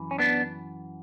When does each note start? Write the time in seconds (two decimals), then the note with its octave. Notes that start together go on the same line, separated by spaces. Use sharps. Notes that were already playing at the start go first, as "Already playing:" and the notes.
Already playing: F#2 E3
0.11 C#4
0.19 B3 D4